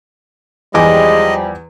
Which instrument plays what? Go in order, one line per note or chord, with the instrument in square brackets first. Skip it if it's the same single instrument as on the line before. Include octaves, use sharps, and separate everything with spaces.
[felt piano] E2 G#5 D6 [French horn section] F3 G3 [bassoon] G#3 [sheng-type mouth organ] D#5